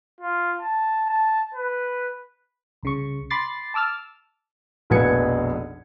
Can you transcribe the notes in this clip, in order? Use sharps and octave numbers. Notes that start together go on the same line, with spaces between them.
F4
A5
A5
B4
C2 C#3 C#6
B5 C6 D6 A6 C7
A5 D6 E6 F6 A6
F1 A#1 B2 B4 G#6 C#7